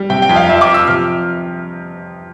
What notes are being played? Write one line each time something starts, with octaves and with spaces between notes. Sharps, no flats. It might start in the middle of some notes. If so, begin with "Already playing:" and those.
Already playing: G3
C3 G5
G5
F2
F5
F2 E5
D6
F3
E6
C3 F6